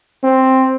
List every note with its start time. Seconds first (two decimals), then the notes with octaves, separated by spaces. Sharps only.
0.23 C4